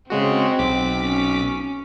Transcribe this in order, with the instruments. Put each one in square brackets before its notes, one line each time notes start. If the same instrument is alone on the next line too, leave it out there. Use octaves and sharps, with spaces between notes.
[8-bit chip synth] C#3 G#3 F#4 [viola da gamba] C4
[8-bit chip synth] B1 D6 B6
[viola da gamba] C#4